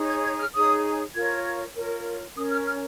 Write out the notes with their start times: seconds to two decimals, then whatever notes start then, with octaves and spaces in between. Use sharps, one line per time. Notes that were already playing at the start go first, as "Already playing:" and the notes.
Already playing: D#4 G#4 C#5
0.08 G#6
0.23 G#6
0.39 F6
0.53 D#4 G#4 C#5 D#6
1.14 F4 A#4 C#5 G#6
1.74 F4 A#4 C#5
2.35 C#4 A#4 C#5 D#6
2.50 F6
2.66 F6